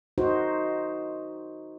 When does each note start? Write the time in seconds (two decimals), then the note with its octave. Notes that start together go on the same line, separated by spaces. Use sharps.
0.18 D#4 F#4 C5